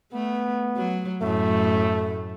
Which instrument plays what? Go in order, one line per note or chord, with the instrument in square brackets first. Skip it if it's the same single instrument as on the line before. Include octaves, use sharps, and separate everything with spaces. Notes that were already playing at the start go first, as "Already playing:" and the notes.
[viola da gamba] A3 [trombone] B3
[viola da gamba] F#3
[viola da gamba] F#2 A2 [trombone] A3